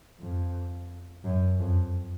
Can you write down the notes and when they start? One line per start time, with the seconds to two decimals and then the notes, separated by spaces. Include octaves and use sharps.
0.20 F2
1.24 F#2
1.59 F2